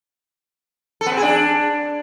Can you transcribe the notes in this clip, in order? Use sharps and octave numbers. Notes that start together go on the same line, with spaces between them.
A4
B3
C4
G#4
D4